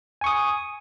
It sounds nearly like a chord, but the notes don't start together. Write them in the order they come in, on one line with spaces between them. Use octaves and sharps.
G#5 C#6 D#6